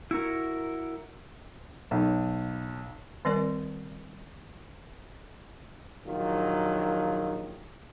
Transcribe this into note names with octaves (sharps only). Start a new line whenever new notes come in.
E4 F#4 A#4
B1
D#3 G3 C4 A#4 D5
A#1 D#3 F#3 F4